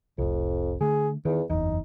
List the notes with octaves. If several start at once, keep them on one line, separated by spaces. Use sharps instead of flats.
F1 C2 F2
D3 A3 G#4
E2 D#3
F#1 E2 D#4